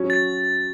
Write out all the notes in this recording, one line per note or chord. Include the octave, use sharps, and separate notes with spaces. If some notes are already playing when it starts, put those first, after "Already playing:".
Already playing: F#3 C#4 F#4
A6